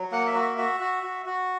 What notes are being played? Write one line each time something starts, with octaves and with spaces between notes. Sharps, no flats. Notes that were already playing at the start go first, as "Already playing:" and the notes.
Already playing: F#3
A#3 F#5
E5
F#4
E5
F#4 E5
F#4
F#4
F#4